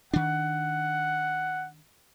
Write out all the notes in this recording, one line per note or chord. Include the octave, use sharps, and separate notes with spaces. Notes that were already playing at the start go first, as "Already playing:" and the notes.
D#3 D4 F#5